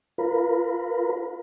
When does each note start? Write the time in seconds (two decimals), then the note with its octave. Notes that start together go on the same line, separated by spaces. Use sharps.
0.18 F4 A#4 B4